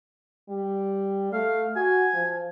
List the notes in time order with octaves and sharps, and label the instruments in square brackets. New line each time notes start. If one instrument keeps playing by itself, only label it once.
[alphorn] G3
[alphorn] A3 [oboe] F5
[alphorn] F#4 [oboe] G#5
[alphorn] F3